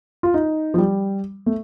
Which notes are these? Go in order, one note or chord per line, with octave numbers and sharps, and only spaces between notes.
F4
D#4
F3
G3
A3